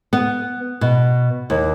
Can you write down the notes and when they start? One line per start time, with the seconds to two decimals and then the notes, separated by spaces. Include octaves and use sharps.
0.13 B3
0.81 B2
1.50 D#2